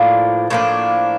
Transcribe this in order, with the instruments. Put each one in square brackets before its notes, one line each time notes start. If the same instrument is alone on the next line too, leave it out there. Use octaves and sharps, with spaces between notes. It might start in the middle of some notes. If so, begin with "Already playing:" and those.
Already playing: [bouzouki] A2 F3 A#3 D4
A2 F3 A#3 D4